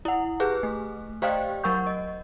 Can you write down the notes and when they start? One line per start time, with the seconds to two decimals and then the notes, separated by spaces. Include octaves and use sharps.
0.05 E4 F#5
0.40 G4 G#4 B4 F#6
0.63 A3
1.22 G4 C5 D5 D#5 F5 G5
1.64 F#3 A#4 F#5 C#6 G6
1.87 D#5